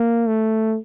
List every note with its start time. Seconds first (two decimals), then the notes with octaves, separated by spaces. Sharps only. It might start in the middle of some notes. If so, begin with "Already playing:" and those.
Already playing: A#3
0.27 A3